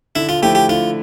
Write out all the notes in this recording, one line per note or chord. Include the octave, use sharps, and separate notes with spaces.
D3 E4
F4
F3 A3 E4 G4
G4
D3 F4